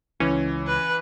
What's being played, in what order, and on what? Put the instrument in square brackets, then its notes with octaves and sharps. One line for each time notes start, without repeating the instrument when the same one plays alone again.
[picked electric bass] C#2 [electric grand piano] E3 [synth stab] C#4
[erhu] B4